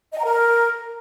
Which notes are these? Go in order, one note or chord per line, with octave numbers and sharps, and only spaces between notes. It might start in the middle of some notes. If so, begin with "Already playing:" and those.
D#5
A#5
A#4